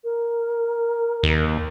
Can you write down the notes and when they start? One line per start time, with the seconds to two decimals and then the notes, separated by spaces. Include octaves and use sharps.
0.04 A#4
1.23 D#2